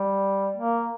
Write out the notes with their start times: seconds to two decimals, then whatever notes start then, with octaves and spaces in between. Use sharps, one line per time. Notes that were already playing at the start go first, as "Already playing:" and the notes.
Already playing: G3
0.56 A#3